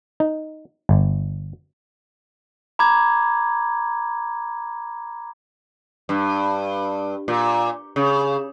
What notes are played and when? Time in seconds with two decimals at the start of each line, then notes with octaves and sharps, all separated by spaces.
0.20 D#4
0.89 G1
2.79 A#5 B5 D6 G#6
6.09 G2
7.28 A#2
7.96 C#3